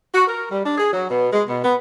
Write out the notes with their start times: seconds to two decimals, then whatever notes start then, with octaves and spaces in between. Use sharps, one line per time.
0.13 F#4
0.27 A#4
0.51 G3
0.65 D4
0.78 G#4
0.92 F#3
1.09 B2
1.32 G#3
1.47 B2
1.63 B3